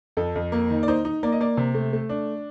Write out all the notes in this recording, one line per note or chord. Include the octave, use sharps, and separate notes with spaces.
F2 A4
F2
A#3
D#3
D5
D#4 C5
D#4
A#3 D5
D#5
A#3 D5
C3
A3
A3
D4